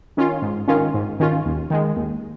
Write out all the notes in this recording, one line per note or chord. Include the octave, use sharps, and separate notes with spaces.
D#3 C#4 F4
G#2
D#3 C#4 F4
G#2
D#3 C#4 F4
D#2
D#3 G#3
D#2